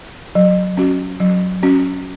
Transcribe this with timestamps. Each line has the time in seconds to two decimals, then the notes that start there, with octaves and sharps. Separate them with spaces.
0.35 F#3
0.77 C#4 F#4
1.20 F#3
1.63 C#4 F#4